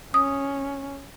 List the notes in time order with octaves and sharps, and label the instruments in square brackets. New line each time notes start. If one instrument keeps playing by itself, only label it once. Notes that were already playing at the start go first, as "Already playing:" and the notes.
[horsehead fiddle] C#4 [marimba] D#6